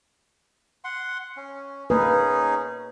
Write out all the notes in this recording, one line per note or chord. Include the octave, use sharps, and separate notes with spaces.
F#5 C6
C#4
A#3 C#4 D#4 G#4 B4